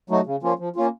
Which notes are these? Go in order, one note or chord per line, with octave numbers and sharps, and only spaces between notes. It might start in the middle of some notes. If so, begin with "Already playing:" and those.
F#3 A3 D#4 F#4
C#3
F3 A#3 C#4 F4
F3
A#3 C#4 F4